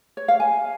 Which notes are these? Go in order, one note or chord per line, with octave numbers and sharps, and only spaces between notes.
C#5
F5
G#5